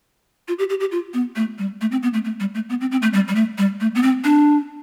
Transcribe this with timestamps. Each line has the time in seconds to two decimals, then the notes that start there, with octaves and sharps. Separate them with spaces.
0.48 F4
0.59 G4
0.70 G4
0.80 G4
0.92 F4
1.14 B3
1.36 A3
1.59 G3
1.81 A3
1.91 C4
2.03 B3
2.14 A3
2.25 A3
2.40 G3
2.55 A3
2.69 B3
2.81 C4
2.92 C4
3.02 A3
3.13 G3
3.28 G3
3.35 A3
3.58 G3
3.81 A3
3.95 B3
4.03 C4
4.24 D4